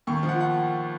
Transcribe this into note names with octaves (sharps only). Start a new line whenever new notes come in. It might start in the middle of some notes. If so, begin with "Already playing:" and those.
D#2 C#6
F3
F#5
F#5